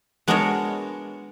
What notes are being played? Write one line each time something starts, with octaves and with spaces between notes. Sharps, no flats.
G#3 B3 D4 F#4 A#4 C#5